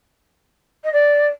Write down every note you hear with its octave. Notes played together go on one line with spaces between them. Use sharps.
D#5
D5